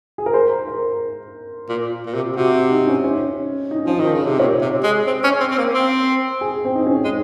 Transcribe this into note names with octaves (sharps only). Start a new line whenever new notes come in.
G#4
A#4
C5
A#4
A#2
A#2
C3
C3 F#4
D#4
C#4
C#4
D#4
F3 C#4
D#4
D#3
C#3
C3
A#2 C#5
C3
G#3
C4 C5
C#4
C4
C4
A#3
C4
G#4
C4
D#4
C#4
G#3